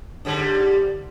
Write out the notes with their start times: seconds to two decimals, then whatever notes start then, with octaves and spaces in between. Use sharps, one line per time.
0.25 G#2 D3 G3